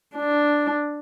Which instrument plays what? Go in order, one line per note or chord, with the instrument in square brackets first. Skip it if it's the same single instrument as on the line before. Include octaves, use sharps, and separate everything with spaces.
[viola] D4